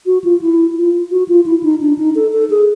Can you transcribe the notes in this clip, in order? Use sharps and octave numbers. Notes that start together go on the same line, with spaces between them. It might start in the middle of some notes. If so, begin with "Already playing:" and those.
F#4
F4
E4
F4
F#4
F4
E4
D#4
D4
D#4
A4
A4
G#4